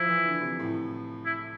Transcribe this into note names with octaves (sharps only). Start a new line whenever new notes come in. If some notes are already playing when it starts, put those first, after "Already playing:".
Already playing: F3 E4
E3
D3
C3
A2
E4